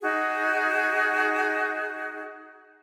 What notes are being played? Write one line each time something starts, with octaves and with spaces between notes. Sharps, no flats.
D#4 F#4 G#4